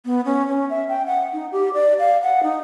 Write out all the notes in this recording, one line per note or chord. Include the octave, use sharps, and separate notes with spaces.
B3
C#4
C#4
E5
G5
F#5
D#4
G4
D5
F5
F#5
D#4